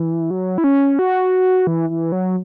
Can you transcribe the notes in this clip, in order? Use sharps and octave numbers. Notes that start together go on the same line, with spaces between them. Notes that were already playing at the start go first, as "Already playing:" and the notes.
Already playing: E3
F#3
E4
C#4
F#4
E3
E3
F#3